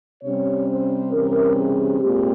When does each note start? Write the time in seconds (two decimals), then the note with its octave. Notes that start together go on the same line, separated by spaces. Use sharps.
0.22 C3 G3 C#4 C#5
0.68 C5
1.11 C3 E3 G3 C#4 A#4
1.56 G#4
2.00 A#2 G#3 C4 G4